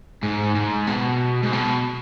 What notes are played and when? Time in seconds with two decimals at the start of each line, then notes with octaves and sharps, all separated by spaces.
0.23 G#2
0.55 G#2
0.87 B2
1.43 G#2
1.53 B2